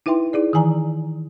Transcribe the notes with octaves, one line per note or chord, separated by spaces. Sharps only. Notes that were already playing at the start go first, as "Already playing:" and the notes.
D#4 E4 B4 E5 G5 C6
D#4 E4 G#4 D5
D#3 E3 G#5 A#5